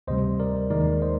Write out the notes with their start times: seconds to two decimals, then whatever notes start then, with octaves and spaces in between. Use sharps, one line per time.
0.07 D2 C3 G3 C5 D#5
0.40 A#4 D5
0.70 D#2 D#3 G#3 D#4 A#4 D5
1.02 C5 D#5